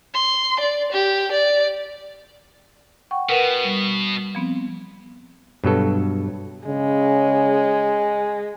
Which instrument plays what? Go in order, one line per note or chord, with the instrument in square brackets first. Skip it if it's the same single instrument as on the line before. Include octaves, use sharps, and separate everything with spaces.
[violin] C6
D5
G4
D5
[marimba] F#5 G5 C#6
[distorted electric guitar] B2 [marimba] A#4 B4 F#5
[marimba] G3
F3 B3 C4
[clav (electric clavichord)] G2 B2 F#3 A4
[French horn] C#3 [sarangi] G#3